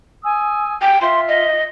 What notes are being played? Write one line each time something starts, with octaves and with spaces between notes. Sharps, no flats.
G#5 D#6 E6
G5
F4 E5 C6
D#5